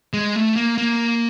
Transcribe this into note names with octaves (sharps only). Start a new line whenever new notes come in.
G#3
A3
A#3
A#3